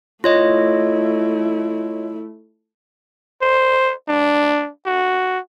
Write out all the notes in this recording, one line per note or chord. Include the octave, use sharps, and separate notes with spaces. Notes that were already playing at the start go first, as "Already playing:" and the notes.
A3 E4 F4 C#5 D#5
C5
D4
F#4